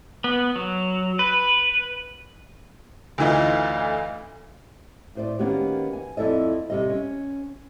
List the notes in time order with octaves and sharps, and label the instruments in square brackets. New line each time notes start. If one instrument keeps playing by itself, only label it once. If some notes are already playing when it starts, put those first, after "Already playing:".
[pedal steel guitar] B3
F#3
B4
[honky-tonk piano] D2 D3 E3 D#4 F4
[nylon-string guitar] A2 C5 D5
D#3 A#3 B3 C#4 F#4 G4
G#5
F2 E4 A4 D5 D#5
C3 G3 D#5
C#4